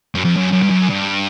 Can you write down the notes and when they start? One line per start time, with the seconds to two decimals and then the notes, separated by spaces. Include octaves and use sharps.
0.15 F#2
0.25 F2
0.36 F#2
0.52 F#2
0.62 G2
0.70 F#2
0.89 G2